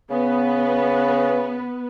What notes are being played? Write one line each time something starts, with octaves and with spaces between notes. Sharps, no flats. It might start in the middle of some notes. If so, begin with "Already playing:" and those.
C#3 B3 B4